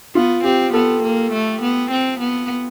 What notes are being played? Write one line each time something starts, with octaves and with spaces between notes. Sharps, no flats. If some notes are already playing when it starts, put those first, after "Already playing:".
B3 F4
C4 G4
B3 A4
A#3
A3
B3
C4
B3